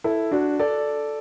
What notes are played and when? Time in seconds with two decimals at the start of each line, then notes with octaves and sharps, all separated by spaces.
0.04 E4 A4
0.31 D4 F#4
0.59 A4 D5